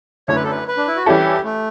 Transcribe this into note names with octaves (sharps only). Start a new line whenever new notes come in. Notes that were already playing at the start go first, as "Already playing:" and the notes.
F#2 D3 A3 C#4 E4 C#5
B4
A4
B4
B4
D4
E4
F#4
E3 G3 C#4 E4 G4 A4
A3